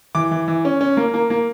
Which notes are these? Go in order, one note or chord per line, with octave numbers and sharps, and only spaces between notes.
E3 D6
E3
E3
C#4
C#4
A#3
A#3
A#3